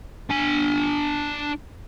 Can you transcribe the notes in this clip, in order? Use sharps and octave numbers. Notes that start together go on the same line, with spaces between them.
D4 G#5